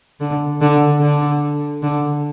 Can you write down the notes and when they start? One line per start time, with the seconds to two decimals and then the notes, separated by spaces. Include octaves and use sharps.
0.21 D3
0.61 D3
1.01 D3
1.83 D3